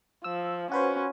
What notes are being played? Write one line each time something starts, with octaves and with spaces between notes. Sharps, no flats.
F3 E6
C#4 F#4 B4 C5